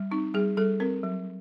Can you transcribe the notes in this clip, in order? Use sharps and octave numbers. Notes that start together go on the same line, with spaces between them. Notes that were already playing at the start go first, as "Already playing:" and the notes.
Already playing: G3
C4 D#4
G3 G#4
G3 A4
C4 A#4
F#3